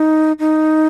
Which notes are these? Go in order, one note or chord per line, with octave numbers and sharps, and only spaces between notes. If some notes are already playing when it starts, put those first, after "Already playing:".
Already playing: D#4
D#4